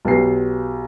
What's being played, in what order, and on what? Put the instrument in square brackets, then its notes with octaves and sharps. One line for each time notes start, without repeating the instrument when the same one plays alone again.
[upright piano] B1 B3 G4 C7